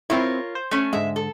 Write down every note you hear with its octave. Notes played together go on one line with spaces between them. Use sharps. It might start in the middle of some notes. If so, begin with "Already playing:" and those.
C4 E4 F4 A#4 C#5
C5
A3 C#4
G#2 D3 G#3 E5
A4